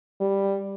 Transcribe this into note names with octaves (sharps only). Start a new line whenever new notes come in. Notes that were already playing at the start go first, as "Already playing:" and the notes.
G3